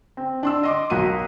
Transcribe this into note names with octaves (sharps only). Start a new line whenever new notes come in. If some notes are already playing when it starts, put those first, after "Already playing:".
C4
D4 C6 E6
D#5 C6 D6
B1 F#4 A#4 D#7